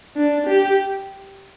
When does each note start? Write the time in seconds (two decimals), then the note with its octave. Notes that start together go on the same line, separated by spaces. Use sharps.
0.16 D4
0.47 G4